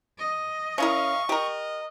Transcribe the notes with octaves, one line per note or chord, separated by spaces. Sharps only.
D#5
C#4 E4 A#4 F5 C#6
G4 A#4 D#5